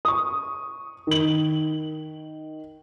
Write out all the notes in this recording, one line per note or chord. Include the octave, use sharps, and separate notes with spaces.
C#6 D#6
D#3 F#7